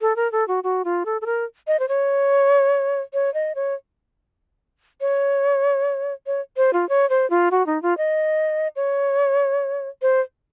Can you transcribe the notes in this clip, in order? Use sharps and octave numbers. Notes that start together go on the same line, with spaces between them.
A4
A#4
A4
F#4
F#4
F4
A4
A4
A#4
D#5
C5
C#5
C#5
D#5
C#5
C#5
C#5
C5
F4
C#5
C5
F4
F#4
D#4
F4
D#5
C#5
C5